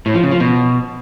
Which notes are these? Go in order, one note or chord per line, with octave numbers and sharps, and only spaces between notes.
A2
F3
C#3
F3
B2